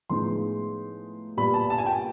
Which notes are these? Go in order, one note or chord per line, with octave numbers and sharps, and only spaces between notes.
A2 F3 G#3 B3 D#4 C6
A#2 G3 B3 B5
A5
A5
G#5
G5